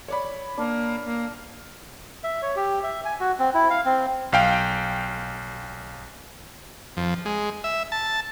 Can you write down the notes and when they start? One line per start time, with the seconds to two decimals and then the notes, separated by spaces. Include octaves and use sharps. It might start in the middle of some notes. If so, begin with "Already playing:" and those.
0.08 C#5 D5 B5
0.58 A#3 D4
1.05 A#3
2.24 E5
2.42 C#5
2.56 G4
2.83 E5
3.05 G#5
3.20 F#4
3.39 C4
3.54 E4
3.70 F5
3.85 C4
4.33 B1 F5 G5
6.97 F2
7.25 G#3
7.64 E5
7.92 A5